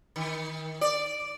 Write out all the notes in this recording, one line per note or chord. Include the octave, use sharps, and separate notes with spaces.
D#3
D5